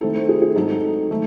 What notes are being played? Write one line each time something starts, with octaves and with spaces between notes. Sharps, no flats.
D#3 A3 C4 E4 A4
C5
G#4
G#4
G#2 F#3 C4 D#4 A4
D#3 A3